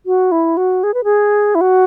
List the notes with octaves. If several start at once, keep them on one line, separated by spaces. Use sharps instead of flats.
F#4
E4
F#4
G#4
B4
G#4
E4
F#4